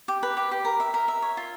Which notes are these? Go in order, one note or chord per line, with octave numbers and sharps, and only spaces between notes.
G4
B4
G4
G4
A#4
E5
A#4
E5
C#5
F4